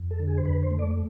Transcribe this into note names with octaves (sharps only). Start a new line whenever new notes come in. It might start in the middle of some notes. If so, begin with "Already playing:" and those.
Already playing: F2
A4
D3
G#4
C5
F2 B4
C5
A3
D5